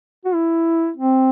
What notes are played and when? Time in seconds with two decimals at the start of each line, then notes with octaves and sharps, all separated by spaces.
0.25 F#4
0.34 E4
0.97 C4